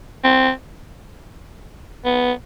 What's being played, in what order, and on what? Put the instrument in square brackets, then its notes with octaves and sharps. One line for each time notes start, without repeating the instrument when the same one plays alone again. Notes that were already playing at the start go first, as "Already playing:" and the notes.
[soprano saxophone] C4
B3